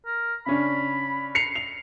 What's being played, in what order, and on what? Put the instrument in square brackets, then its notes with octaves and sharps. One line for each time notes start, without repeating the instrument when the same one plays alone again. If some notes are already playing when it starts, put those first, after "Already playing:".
[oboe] A#4
[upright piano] C#3 C#4 D4 [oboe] B5
[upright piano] C7 C#7 F7
F7